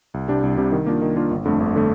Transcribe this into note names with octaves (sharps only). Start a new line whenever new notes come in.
C2
C3 G3 D4 G4
C2
C3 G3 D4 G4
D#3
A#3 D4 F4
D#3
A#3 D4 F4
G1
F2 D3 A3
G1
D3 A3